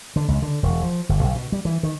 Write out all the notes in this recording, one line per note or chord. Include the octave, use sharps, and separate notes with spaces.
D3
C#2
D3
E1
F3
G1
B1
B2
G3
E3
D#3